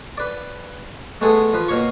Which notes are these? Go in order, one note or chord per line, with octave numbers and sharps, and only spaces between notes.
B4 D5
G#3 A3 B3 G#4 A4
F3 B4
B2 A#3 C#5 C#6